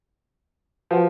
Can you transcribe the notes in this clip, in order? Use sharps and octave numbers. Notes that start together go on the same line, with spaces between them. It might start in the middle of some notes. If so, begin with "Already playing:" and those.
F3 F#4 B4 F#5